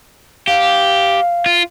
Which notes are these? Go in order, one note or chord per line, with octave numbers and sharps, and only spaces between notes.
G4 F5
F4